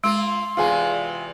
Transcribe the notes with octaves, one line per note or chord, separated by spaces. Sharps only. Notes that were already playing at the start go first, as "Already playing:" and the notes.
G#3 A#3 F4 C6
E2 C3 E3 F4 G#4 G#5